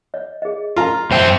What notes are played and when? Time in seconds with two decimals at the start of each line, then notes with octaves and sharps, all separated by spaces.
0.14 C#5 D#5
0.42 G#4 D#5
0.76 F4 A#5 C6
1.11 F#2 C5 E5 G5